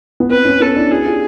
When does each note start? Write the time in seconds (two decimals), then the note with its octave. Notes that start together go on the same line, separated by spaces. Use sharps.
0.20 B3
0.30 C4 B4
0.45 B3 C#4
0.60 B3 C#4 A4
0.76 D4 E4
0.90 E4 F#4 G#4
1.06 F4 G4